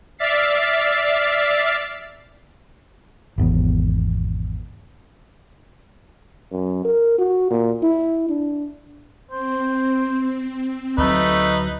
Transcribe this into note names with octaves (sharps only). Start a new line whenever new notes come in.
D5 E5 F6 A6 B6 C7
G#1 E2 B2
F#2
A#4
F#4
A#2
E4
D4
C4 C5
D2 F#3 A3 D#4 B4